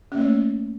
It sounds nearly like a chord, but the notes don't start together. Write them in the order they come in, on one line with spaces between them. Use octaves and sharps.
C#4 A#3 C#5 A3